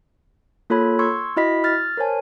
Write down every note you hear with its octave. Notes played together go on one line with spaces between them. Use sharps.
A#3 F4 A4 C#5 B5 G#6
C6 C#6 E6 G#6
E4 F#4 D#5 B5 B6
F6 A6
A#4 C5 C#5 G#5 A5